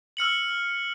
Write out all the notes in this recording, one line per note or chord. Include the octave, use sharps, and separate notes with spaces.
E6 F6 C#7 F#7